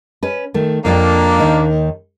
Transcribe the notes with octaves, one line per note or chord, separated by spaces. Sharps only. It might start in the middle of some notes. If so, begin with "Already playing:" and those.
C#4 B4
D#3 A3
F2 A#3 D4 F4 G5
D#2 D#3 D#4